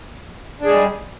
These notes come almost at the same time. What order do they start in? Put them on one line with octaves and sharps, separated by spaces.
D4 G#4 G#3 G3